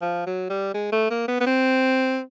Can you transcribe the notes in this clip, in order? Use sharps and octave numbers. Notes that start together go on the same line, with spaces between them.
F3
F#3
G3
G#3
A3
A#3
B3
B3
C4